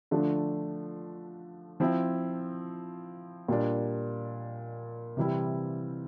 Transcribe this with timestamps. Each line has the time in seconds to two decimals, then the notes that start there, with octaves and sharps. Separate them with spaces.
0.11 D3 F3 A3 D4
1.80 F3 C4 E4
3.48 A#2 G3 D4
5.17 C3 E3 G3 C4 E4